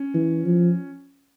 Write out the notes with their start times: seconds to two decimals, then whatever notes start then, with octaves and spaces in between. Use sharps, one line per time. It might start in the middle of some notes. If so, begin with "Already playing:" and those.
Already playing: C#4
0.14 E3
0.44 F3